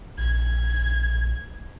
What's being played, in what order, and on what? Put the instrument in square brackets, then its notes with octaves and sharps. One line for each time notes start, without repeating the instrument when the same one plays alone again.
[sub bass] A#1 [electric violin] G#6